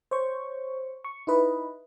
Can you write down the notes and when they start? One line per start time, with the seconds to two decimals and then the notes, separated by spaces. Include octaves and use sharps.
0.11 C5 C#5 C#6
1.04 C#6
1.27 D#4 E4 B4 D#5